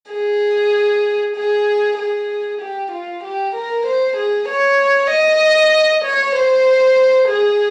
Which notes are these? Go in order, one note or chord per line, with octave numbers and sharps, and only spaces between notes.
G#4
G#4
G#4
G4
F4
G4
A#4
C5
G#4
C#5
D#5
C#5
C5
G#4